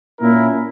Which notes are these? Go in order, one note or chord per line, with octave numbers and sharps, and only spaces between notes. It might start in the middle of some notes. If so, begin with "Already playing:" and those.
A#2 A#3 C#4 E4 A#4